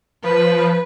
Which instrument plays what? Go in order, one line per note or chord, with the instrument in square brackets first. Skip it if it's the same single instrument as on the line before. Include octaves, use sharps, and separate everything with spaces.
[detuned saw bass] F3 [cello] B4